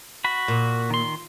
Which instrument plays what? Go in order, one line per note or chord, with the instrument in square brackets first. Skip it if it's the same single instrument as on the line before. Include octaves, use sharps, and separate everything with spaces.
[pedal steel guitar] F#4 B5
[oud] A#2
[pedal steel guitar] D#3 C6